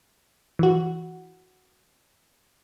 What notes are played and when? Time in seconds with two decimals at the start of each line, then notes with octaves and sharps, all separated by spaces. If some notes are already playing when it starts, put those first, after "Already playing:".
0.59 E3 F#4